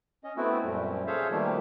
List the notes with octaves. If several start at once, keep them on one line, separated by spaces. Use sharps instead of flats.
C#4 D#5
A3 B3 C4 E4 F#4
F#2 A#2 F3 G3
G#4 A4 C5 C#5 E5 F5
B2 D#3 F3 G3 A3 A#3